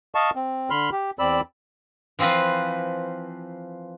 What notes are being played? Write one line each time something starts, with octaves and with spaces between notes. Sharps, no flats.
D#5 F5 A5 C#6
C4
D3 B5 C6 F6
G4
E2 C4 D5 B5 E6
E3 F3 C4 F4 B4